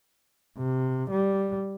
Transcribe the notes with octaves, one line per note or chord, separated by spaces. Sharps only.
C3
G3